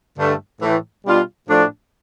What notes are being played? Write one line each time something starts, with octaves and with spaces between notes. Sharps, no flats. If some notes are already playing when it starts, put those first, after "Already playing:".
G2 D3 A3
A2 E3 A3
B2 G3 D4 F4
A2 F3 A3 D4